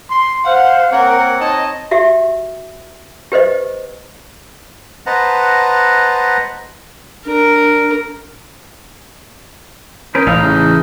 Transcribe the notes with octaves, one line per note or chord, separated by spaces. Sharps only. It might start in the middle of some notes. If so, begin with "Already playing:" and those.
C6
C5 F5 F#5
A#3 C4 A#4 C#5 F#5
D#4 C#5 D#5 A5
F#4 G4 E5
G4 B4 C5 D#5
B4 C5 D#5 F#5 A5 A#5
D4 A#4
C#4 D#4 A#4 B4
A1 F5
C#3 E3 F6